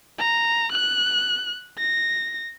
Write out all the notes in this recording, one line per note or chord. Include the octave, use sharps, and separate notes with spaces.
A#5
F#6
A#6